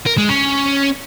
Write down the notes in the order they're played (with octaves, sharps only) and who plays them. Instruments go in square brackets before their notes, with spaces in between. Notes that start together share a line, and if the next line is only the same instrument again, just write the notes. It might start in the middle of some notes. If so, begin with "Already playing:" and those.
[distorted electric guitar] A#4
G#3
C#4